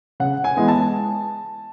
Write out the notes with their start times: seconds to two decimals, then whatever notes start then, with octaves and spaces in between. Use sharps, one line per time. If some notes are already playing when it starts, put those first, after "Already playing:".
0.20 C#3 F#5
0.44 G#5
0.57 E3 G#3 B3
0.68 A5